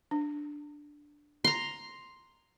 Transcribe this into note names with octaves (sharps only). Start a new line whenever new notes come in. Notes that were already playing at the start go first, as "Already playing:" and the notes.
D4
A#5 C6